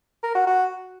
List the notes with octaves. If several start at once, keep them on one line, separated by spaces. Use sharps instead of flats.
A#4
F#4
F#4